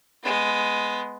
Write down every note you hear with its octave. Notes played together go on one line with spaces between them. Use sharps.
G#3 B3